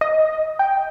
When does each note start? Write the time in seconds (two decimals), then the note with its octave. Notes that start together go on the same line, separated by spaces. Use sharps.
0.01 D#5
0.59 G5